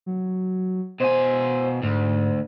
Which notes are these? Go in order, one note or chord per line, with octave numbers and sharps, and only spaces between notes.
F#3
B2 C5 G#5
D2 G#2